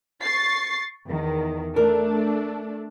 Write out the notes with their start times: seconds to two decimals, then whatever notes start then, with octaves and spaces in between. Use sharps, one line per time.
0.23 C#6 A6 C7
1.05 E2 D#3
1.76 A3 D4 A#4